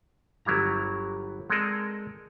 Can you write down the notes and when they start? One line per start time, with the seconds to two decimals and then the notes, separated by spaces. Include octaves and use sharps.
0.45 G1 F#3 G3 E4 A#5
1.50 G#3 C4 A4 A#4 D5 D#5